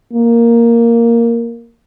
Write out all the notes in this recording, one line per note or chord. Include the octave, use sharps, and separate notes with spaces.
A#3